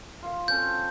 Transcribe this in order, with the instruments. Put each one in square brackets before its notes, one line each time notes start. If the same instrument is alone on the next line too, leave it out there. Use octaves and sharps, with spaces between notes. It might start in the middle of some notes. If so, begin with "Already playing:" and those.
[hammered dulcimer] F4 F5
[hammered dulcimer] C4 C#4 A4 [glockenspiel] G6